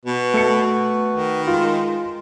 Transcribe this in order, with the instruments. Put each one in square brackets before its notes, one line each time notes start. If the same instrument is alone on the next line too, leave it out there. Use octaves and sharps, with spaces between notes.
[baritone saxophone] B2 [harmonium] F#4 B4
[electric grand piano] A3 C#7
[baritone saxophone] D#3
[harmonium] G#3 [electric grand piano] F4